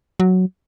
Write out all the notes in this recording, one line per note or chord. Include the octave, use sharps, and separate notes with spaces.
F#3